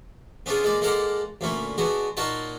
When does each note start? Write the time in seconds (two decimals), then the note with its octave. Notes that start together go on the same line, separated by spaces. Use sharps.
0.46 B3 C#4 D4 E4 F4 G#4
0.64 G#3 A#3 D5 D6
0.81 G#3 A#3 A4 D5 F5 F#5
1.41 D2 A#2 C#4 E4
1.78 G#3 B3 D4 F#4
2.17 A#2 A#3 D#4 F#4 C#5 A5